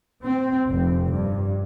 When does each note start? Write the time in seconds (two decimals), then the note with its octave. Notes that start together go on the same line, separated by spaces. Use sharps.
0.22 C4
0.69 F1
1.12 G2